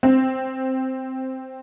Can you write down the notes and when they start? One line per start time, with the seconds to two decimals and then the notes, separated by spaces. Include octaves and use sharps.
0.03 C4